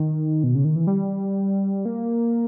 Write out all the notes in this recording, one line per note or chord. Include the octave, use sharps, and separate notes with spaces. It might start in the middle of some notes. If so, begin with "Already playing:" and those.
Already playing: D#3
B2
C#3
D#3
E3
G3
A#3